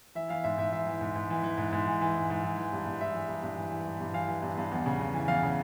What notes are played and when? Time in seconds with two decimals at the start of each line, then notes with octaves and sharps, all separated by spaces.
0.15 E3 E5
0.30 E3 F5
0.44 G#2 E5
0.58 G#2 E5
0.72 E3 E5
0.86 E3
1.01 G#2
1.16 G#2
1.30 E3
1.43 E3
1.58 G#2
1.72 G#2
1.87 E3
2.01 E3
2.15 G#2
2.30 G#2
2.44 E3
2.57 E3
2.73 G2
2.86 G2
3.00 E3 E5
3.14 E3
3.28 G2
3.43 G2
3.57 E3
3.71 E3
3.86 G2
4.01 G2
4.14 E3 F5
4.28 E3
4.43 G2
4.58 G2
4.72 E2
4.86 C#3
5.00 E2
5.14 E3
5.28 E2 F5
5.43 C#3